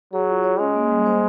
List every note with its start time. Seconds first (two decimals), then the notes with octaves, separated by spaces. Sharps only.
0.13 F#3 G#4
0.29 F4
0.44 C#5
0.60 G#3 C#4
0.75 A#3
0.91 G3
1.06 C5